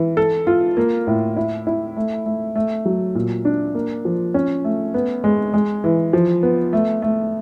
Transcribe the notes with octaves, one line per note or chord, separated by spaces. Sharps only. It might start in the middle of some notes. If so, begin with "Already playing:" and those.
Already playing: E3
A4
F4
A#3
A2
E4
E4
A3
A3
A3
F#3
A#2
D4
A#3
F3
C#4
A3
B3
G#3
G#3
E3
F3
B3
A3
A3